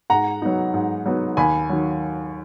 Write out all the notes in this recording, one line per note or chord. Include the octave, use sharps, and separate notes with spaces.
G#2 F#5 A#5
F#3 B3 D#4
G#2
F#3 B3 D#4
D#2 G#5 B5
D#3 F#3